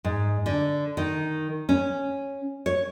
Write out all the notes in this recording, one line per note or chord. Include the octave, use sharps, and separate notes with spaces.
G#2
D3
D#3
C#4
C#5